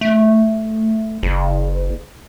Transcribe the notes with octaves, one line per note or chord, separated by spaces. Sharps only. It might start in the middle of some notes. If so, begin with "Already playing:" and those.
A3
F#1